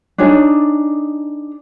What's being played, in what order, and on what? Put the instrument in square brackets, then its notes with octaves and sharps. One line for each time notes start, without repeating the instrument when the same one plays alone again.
[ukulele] D4 D#4 G#4 C#5